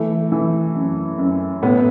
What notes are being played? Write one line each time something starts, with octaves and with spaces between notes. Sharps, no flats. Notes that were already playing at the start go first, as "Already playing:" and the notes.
Already playing: E3 A3
E3
F#2
F#2
A2 B3